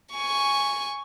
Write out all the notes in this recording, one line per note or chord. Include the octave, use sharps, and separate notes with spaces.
G#5 C#6